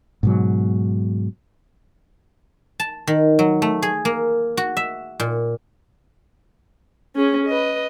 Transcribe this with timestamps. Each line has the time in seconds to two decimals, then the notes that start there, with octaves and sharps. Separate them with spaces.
0.23 G#2 B2 F#3
2.80 A5
3.07 D#3
3.39 F#3
3.62 A3
3.82 G#4
4.05 A#3
4.57 F#4
4.77 E5
5.20 A#2
7.16 C#4 G#4
7.46 B4 D#5